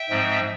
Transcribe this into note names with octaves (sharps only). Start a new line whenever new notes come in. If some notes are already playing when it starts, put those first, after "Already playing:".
Already playing: E5 G5
G#2 F3 G#3 C4